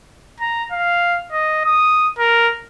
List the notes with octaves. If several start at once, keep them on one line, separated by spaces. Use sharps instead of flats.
A#5
F5
D#5
D#6
A#4